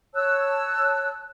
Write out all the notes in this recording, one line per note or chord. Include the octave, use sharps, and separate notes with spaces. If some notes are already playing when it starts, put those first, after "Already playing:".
C#5 A5 E6 F#6